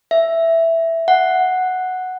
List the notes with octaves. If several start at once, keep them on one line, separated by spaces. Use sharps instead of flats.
E5
F#5